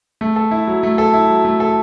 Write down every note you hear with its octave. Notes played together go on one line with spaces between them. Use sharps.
A3
A4
E4
F#3
A3
A4
E4
F#3
A3
A4